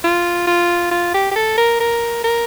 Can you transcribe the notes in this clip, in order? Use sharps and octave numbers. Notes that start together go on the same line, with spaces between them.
F4
F4
F4
G4
G4
A4
A#4
A#4
A#4